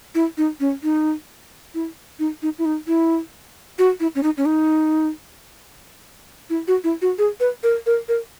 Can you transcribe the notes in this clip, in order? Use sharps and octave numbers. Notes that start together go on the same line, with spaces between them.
E4
D#4
C#4
D#4
E4
D#4
D#4
E4
D#4
E4
F#4
E4
C#4
D#4
C#4
D#4
E4
F#4
E4
F#4
G#4
B4
A#4
A#4
A#4